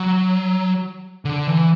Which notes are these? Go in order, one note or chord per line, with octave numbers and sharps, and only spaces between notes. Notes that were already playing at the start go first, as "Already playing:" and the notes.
Already playing: F#3
D3
E3